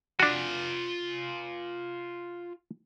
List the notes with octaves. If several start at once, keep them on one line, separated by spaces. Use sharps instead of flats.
D4 F4 F#4 G#5